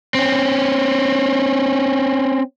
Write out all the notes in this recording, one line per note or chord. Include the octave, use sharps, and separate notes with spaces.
C4 C#4